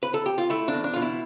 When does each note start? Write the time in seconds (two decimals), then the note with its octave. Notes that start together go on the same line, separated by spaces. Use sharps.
0.03 B4
0.14 A4
0.26 G4
0.38 F4
0.50 A3 E4
0.68 D4
0.73 E2
0.84 D4
0.94 B2 F4
1.02 E4